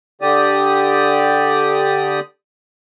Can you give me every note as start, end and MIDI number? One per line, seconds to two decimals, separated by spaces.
0.21 2.20 50
0.21 2.20 67
0.21 2.20 74
0.21 2.20 87